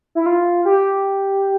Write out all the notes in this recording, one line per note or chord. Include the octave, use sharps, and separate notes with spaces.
E4
F4
G4